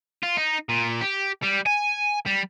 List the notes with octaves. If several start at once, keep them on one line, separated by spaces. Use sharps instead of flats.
F4
D#4
A#2
G4
G3
G#5
G3